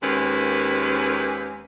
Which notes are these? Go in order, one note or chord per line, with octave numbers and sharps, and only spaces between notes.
D#2 G#3 A#3 C4 C#4 B4